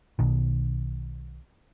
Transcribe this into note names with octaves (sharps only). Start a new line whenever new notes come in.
B1 B2 D#3